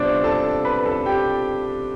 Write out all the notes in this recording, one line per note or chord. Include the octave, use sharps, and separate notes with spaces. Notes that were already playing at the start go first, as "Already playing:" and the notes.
Already playing: C3 G3 B3 C4 D4 F4 D5
A4 A5
B4 B5
A4 A5
G4 G5